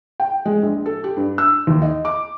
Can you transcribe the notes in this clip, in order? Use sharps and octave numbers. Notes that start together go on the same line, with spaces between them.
G5
G#3
A#1
A4
G4
G2
E6
D#2
D#5
D6